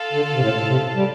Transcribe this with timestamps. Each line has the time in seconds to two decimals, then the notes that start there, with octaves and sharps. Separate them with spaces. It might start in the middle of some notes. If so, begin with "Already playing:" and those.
Already playing: F4 A4 F5 A5
0.13 D3
0.34 C3
0.41 A2
0.68 C3
0.96 G3